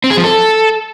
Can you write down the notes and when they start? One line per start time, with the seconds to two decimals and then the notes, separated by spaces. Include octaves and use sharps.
0.04 C4
0.10 G#4
0.17 F3
0.24 A4